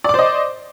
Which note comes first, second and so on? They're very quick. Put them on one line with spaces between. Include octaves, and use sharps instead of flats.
D5 D6 C5 D#5